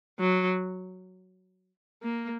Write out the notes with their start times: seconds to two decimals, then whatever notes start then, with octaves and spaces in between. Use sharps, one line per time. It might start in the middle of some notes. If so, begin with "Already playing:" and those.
0.19 F#3
2.03 A#3